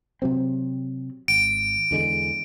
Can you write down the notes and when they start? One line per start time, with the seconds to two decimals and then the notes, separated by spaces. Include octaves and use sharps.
0.22 C3 F#3 C4
1.28 G#1 D7
1.91 E2 D3 G#3